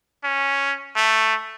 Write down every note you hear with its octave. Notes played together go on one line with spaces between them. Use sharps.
C#4
A3